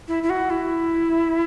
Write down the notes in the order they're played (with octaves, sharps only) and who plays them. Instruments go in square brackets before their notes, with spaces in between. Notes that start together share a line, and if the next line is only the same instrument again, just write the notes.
[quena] E4
E4
F#4
E4